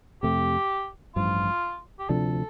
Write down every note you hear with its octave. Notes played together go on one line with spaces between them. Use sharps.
F2 C3 A3 G4
A1 G2 F3 F4
G4
D2 C3 F3 D4 A4